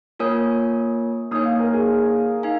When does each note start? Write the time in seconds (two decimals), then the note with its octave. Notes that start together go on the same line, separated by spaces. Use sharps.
0.19 A#3 F4 A#4 C#5 G#5 D#6
1.31 A#3 D#4 C#5 G#5 D#6
1.45 F5
1.59 A#4
1.73 G#4
1.87 G#4
2.43 D#4 F5 G#5